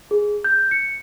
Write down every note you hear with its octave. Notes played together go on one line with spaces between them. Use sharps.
G#4
G6
C#7